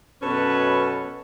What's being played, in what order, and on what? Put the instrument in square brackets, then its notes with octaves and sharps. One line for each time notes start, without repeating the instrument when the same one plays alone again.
[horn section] F#2 B2 C#4 A4 B4